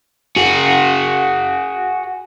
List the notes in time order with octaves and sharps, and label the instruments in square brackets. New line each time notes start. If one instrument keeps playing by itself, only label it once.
[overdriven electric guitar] F#4 G#4